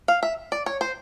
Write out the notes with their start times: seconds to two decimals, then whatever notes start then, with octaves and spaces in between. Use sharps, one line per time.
0.08 F5
0.23 E5
0.52 D5
0.66 C#5
0.81 C5